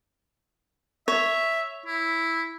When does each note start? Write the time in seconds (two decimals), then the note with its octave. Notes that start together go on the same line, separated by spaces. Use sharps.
1.08 C#5 E5
1.86 E4